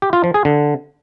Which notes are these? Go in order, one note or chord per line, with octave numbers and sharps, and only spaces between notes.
G4
F4
F3
G#4
D3